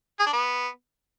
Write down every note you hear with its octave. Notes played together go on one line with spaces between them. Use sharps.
G#4
D4
B3